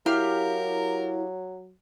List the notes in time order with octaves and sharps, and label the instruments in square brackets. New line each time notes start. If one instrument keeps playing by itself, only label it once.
[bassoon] F#3 [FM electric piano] E4 [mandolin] G4 F5 F6 [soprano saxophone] A#4